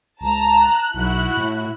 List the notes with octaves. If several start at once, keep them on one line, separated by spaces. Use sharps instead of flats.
C#2 A5 A#5
F#6
B1 E4 F#4
A2